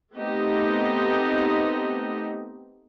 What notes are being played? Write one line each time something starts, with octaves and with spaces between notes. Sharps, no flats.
A3 B3 C4 D#4 G4 D#5